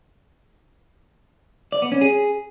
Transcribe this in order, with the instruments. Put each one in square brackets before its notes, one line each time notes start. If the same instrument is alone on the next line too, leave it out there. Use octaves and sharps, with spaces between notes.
[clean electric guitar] D5
B3
C#4
G#4